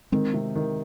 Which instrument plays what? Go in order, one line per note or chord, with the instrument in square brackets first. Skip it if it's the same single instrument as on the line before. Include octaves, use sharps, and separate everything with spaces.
[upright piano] D#3 [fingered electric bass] G#3 C4
[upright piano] C3
D#3